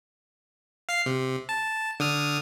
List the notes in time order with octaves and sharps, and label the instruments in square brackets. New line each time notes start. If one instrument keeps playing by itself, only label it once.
[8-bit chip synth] F5 C7
C3
A5
D3 D#6 F6